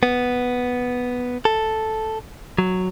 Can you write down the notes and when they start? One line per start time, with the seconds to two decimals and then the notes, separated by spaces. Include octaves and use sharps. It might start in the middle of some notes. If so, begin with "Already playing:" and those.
0.03 B3
1.45 A4
2.58 F#3